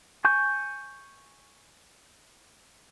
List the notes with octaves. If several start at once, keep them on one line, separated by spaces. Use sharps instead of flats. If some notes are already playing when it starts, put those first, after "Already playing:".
G#5 C#6 G6